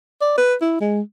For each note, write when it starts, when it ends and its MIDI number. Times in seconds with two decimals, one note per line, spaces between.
0.21 0.37 74
0.38 0.55 71
0.61 0.77 64
0.81 1.01 56